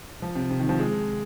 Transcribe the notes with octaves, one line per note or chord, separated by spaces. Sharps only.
F3
C3
C3
D#3
F3
G#3